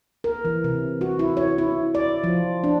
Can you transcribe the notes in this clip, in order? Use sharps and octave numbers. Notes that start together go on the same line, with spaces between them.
A#4
E3
C3
F#4
E4
C#5
E4
D5
F3
D4